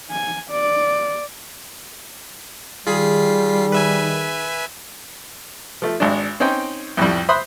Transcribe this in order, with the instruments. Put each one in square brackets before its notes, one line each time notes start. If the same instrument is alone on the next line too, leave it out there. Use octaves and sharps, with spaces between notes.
[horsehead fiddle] G#5
D5
[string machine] D#3 [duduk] G3 [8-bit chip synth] F4 B6 C7 [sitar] G#4
[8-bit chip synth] B4 E5 G#5
[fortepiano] F3 A3
G#1 G#3 D4
C4 C#4 D#4 C5 G5
C2 F2 A2 G3
C5 E5 B5 C6 D#6 F#6